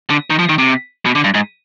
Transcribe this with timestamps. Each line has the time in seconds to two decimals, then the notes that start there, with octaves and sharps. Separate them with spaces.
0.10 D3
0.30 D#3
0.39 F3
0.49 D#3
0.58 C3
1.06 B2
1.15 D3
1.24 G2
1.34 G#2